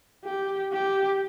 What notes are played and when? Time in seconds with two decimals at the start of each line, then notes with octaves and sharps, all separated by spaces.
0.25 G4
0.73 G4